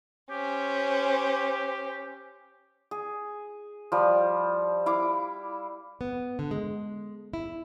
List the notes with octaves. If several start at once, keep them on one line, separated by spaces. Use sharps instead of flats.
C#4 G4 C5
G#4
F3 G3
E4 F5 D6
B3
D3
G#3
E4